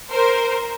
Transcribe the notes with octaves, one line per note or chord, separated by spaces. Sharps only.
A#4 C5